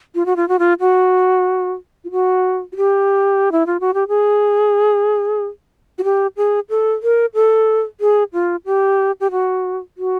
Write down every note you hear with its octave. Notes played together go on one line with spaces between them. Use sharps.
F4
F#4
F4
F#4
F4
F#4
F4
F#4
F#4
G4
E4
F4
F#4
G4
G#4
F#4
G4
G#4
A4
A#4
A4
G#4
F4
G4
G4
F#4
F#4